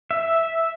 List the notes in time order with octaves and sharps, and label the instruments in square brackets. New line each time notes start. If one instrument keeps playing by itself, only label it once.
[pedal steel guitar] E5